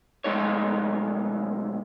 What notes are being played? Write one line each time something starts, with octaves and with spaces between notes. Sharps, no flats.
B1 F2 G#3 A3 D#4 C#5